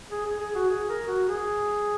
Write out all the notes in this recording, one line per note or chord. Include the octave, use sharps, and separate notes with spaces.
G#4
G#4
G#4
F#4
G#4
A#4
F#4
G#4